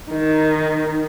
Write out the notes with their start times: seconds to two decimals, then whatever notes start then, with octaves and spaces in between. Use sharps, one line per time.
0.12 D#3